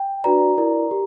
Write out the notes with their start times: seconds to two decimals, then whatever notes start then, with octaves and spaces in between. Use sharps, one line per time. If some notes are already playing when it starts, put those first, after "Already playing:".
Already playing: G5
0.24 D4 F#4 B4 D5 A#5
0.57 E4 A#4 D5
0.91 G4